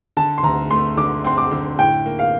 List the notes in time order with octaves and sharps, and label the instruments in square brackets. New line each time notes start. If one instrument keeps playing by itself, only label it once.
[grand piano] D3 [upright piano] A5
[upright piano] C6
[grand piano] D2 [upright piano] A#5
[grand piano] A3 [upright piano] C6
[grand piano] D3 [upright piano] D6
[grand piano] C4 [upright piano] C6
[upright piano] D6
[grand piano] D3
[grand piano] A2 [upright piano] G5
[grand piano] A#3
[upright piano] F5